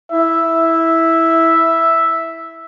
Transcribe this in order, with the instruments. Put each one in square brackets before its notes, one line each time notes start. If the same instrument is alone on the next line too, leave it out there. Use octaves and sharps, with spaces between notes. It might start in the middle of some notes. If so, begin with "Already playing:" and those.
[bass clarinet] E4 [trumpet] E5